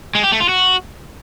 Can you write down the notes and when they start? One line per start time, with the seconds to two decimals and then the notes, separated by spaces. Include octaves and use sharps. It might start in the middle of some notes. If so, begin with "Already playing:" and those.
0.15 G#3
0.23 G4
0.32 A3
0.40 F4
0.49 F#4